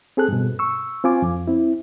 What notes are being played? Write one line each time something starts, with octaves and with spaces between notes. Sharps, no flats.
C4 G#4 A4 F#6
G2 B2
C#6 E6
C4 F4 G#5 D6
F2
C4 E4